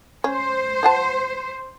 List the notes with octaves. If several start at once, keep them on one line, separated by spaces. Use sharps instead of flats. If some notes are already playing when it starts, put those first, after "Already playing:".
C#4 C5
F3 F#5 A5